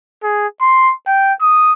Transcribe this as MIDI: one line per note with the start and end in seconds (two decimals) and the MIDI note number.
0.23 0.47 68
0.61 0.94 84
1.07 1.33 79
1.42 1.73 87